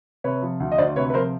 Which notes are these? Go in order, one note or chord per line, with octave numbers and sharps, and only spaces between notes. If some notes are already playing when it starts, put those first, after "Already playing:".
C3 B4 C#5
F3
D2
D#5
D2 C5 D5
C3 B4 C#5
B4
F3 A#4 C5